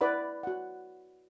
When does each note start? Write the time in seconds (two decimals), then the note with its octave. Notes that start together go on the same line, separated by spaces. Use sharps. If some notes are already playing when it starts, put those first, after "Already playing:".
0.01 E4 B4 D5 F#5 B5
0.43 F#4 F#5